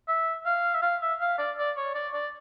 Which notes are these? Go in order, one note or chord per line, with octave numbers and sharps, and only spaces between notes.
E5
F5
E5
F5
E5
F5
D5
D5
C#5
D5
D5